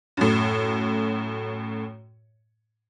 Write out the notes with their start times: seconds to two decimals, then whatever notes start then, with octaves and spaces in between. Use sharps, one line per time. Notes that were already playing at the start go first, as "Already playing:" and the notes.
0.17 F#2 A2